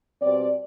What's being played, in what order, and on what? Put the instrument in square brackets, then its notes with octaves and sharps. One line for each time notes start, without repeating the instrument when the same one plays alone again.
[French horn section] B2 G3 C4 D5